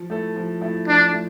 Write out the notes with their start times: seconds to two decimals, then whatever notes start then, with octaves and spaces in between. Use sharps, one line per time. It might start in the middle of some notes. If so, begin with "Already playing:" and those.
Already playing: F3
0.10 A3 E4 A4
0.36 F3
0.61 A3 E4 A4
0.87 F3 D4
1.13 A3